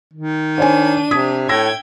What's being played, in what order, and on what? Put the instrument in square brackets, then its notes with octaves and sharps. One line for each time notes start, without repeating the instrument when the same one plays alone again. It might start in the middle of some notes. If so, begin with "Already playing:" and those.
[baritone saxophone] D#3
[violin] D4 D#7 [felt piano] C5 C#5 G#5
[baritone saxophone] C3 [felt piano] D#6 G#6 B6
[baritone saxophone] A2 [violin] G5 G#6 [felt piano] E6 A#6